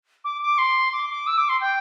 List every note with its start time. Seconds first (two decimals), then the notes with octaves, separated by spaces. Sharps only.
0.24 D6
0.42 D6
0.58 C6
0.93 D6
1.10 D6
1.27 E6
1.37 D6
1.49 C6
1.61 G5